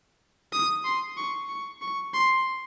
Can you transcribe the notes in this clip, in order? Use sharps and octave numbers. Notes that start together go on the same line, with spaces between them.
D#6
C6
C#6
C#6
C#6
C6